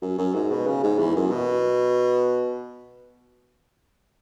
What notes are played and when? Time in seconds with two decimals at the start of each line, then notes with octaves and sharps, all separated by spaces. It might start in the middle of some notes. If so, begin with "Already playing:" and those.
0.02 F#2
0.19 F#2
0.34 G#2
0.51 B2
0.67 C#3
0.84 G#2
0.99 E2
1.16 F#2
1.31 B2